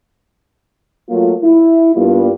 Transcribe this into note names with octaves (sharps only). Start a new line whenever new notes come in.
F#3 A3 A#3 F4
E4
G2 G3 A#3 B3 F4